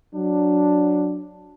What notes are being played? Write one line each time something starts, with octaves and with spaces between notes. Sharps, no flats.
F#3 D4